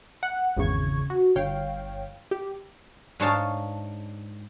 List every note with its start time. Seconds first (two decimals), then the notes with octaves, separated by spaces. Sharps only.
0.23 F#5
0.57 G#1 E2 C#3 C#6 G#6
1.10 F#4
1.36 G1 C#5 F5 G5
2.31 G4
3.20 G#2 D4 C#5 D#5 F5 A5